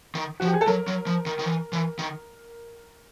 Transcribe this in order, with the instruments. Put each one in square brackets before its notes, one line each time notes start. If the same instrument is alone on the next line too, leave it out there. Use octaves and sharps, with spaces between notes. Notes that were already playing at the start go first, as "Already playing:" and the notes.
[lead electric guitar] D#3
[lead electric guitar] F3 [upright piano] F#4
[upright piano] G4
G#4
A4
[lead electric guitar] F#3 [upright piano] A#4
[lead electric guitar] F#3
F3
D#3
D#3
E3
E3
D#3